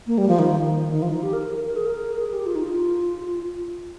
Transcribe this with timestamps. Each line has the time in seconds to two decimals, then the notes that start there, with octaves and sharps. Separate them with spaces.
0.07 A#3
0.18 G3
0.28 F3
0.39 D#3
0.91 D#3
1.02 F3
1.12 D#4
1.23 G4
1.33 A#4
1.65 A#4
1.76 G#4
1.86 A#4
2.19 G#4
2.33 G4
2.46 F4
2.55 D#4
2.64 F4